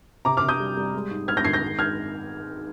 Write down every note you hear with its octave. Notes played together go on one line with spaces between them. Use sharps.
C3 A#5 D6
D6 F6
C3
D#6 G6
G3
G3
G#3
G#2
G#2 F6 G#6
G6 A#6
D#3 G#6 C7
G6 A#6
G#2
G#2 F6 G#6